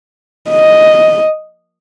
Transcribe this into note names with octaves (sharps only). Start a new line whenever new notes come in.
D#5